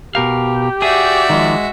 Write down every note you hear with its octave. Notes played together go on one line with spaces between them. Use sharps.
B2 G4 A#4 F5
F#4 G#4 D5 E5
D#3 F3 G#3